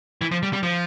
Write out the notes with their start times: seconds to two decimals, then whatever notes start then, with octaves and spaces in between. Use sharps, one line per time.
0.22 E3
0.31 F3
0.43 G3
0.53 G3
0.63 F3